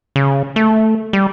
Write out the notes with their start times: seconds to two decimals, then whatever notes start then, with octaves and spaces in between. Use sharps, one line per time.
0.16 C#3
0.56 A3
1.13 G3